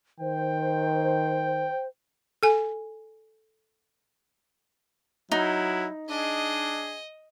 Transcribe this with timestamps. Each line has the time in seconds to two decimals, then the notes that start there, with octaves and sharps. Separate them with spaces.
0.20 D#3 C5 G5
2.43 A4 G#5
5.32 F#3 D#4 E4
6.09 D4 G#4 D#5